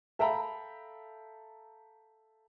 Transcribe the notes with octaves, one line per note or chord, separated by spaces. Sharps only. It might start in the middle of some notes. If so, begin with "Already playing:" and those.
A4 E5 F5 G5 A#5 B5